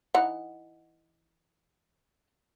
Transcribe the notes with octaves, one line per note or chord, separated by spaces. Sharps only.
E3 D#4 F#5